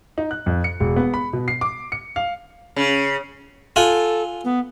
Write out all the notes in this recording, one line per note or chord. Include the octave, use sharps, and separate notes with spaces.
D#4
F#6
F2
C#7
E1
B3
B5
B2
C7
D6
C#7
F5
C#3
F4 A4 F#5 G#5
B3